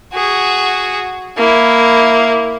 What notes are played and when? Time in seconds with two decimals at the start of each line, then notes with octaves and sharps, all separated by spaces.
0.13 F#4 G#4
1.37 A#3 E4